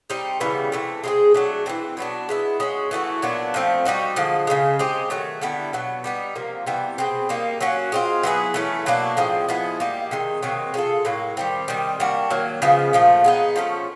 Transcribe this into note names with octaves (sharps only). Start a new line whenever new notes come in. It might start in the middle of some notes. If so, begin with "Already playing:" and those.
G3 C4 D#4
C#3 E3 G3 B3
C3 E3 A3
G#3 C4 E4 G#4
F#3 A3 D4
E3 G3 C4
B2 F#3 B3 D4
G#3 B3 E4
G#3 C#4 F#4
E3 A3 D4 F#4
A#2 F#3 B3 D4
F3 A3 C4
G3 A#3 D#4 F#4
D3 F3 G#3
C#3 F3 G#3
G#3 C4 D#4 G4
D#3 F#3 A3
D3 G3 B3 E4
B2 F#3 B3
G3 B3 D#4
C3 F3 A#3
C3 E3 G3 B3
B2 G#3 C4
G3 A#3 D#4
F#3 A#3 C#4 F#4
G#3 C4 F4
F#3 B3 E4 G#4
E3 A3 C#4
B2 F#3 A#3 D4
A2 F3 G#3 C4
F3 G#3 B3 E4
G3 A#3 D#4
C3 D#3 G#3
C3 D#3 F#3 A#3
G#3 C4 F4 A4
A2 F#3 A#3
D#3 G3 C4
C3 D#3 G3
G3 A#3 D4 F#4
D#3 F#3 A#3
C#3 F3 G#3 B3
A#2 F3 A3
G#3 B3 D#4
F3 A3 C#4